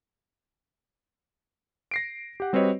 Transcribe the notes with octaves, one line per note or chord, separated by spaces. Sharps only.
A#6 C7 D7
G4 F#5
G3 C4 F#4 B4 C#5 D#5